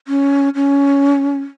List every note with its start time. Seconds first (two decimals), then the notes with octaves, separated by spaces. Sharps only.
0.08 C#4
0.55 C#4